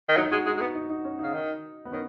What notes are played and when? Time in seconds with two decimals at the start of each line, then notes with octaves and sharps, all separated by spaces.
0.09 D#3
0.17 F#3 D#4
0.31 G#3 F#4
0.46 G#3 D#4
0.57 G#3
0.61 B3 D#4
0.75 D#4
0.90 D#4
1.04 C#4
1.19 C#3 D#4
1.34 D#3
1.85 B3
1.92 D#3 C#4